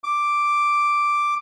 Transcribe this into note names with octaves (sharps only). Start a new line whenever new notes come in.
D6